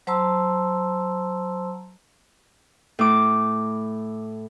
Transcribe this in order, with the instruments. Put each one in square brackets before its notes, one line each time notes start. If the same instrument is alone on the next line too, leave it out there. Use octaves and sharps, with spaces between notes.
[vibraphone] F#3 C5 A5 A#5 C6 E6
[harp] A2 D6